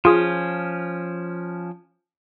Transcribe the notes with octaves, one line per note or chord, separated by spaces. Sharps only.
F3 C#4 F4 G#4